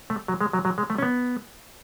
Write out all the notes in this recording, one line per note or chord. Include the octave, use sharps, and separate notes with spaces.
A3
F#3
G#3
F#3
F#3
G#3
A3
C#4
B3